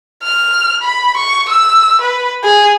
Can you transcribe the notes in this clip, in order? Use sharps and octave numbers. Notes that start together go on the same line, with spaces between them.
F6
B5
C#6
E6
B4
G#4